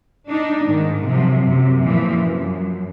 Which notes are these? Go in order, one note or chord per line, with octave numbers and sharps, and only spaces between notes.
D4 D#4
G#2 D#3
C3 F3 F#3
F#2 C3
A#2 E3 F3
F#2